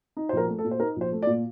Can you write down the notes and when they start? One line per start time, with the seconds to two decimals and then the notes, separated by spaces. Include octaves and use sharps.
0.17 D#4
0.29 C5
0.32 A#1 A#4
0.48 A3
0.58 A4
0.64 A#2
0.71 C5
0.80 D#4 A#4
0.96 A#1
1.01 C5
1.12 A3
1.22 D5
1.27 A#2